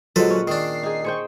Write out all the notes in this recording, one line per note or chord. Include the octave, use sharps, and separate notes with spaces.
A#2 D3 F#3 G#3 A4 B4 C5
C#4 F#5
D#3 D4 C7
D#4 G#4
G#4 C5 G5 C#6